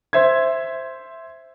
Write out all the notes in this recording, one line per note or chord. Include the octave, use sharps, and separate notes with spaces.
C5 E5 C6 G#6